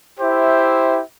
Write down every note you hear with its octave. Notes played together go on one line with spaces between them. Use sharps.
E4 G4 C5 E5